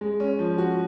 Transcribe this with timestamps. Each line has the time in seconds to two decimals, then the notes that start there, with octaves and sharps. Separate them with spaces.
0.01 G#3
0.20 C#4
0.39 F3
0.58 F#4